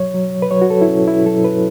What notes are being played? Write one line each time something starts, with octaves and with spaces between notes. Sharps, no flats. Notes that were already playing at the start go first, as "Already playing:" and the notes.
Already playing: F#3 C#5
F#3
B4
F#3 C#5
F#4
A4
E4
F#3 C#4
E4
F#3 A4
B4